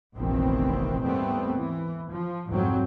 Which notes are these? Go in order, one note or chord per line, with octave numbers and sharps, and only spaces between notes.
F1 A#1 D#3 E3 B3 C4
D#2 G#2 G3 A3 B3 C4
E3
F3
C2 F2 G#2 F#3 C4